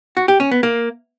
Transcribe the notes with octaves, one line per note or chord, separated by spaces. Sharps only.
F#4
G4
C#4
B3
A#3